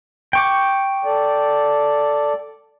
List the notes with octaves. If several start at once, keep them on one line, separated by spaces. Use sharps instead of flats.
G5 C#6 D6
A4 D5